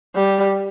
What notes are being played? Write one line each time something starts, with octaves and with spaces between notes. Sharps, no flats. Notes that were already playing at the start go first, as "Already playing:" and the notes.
G3